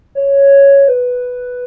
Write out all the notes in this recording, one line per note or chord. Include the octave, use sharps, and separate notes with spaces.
C#5
B4